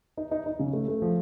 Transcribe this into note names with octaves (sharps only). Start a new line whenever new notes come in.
D#4
D#4
D#4
C#3
A3
A3
F3